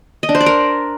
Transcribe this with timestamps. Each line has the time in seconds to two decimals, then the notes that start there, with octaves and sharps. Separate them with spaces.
0.23 D#5
0.29 D4
0.35 C5
0.41 D5
0.46 A#4